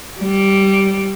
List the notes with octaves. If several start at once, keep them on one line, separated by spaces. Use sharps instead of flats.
G3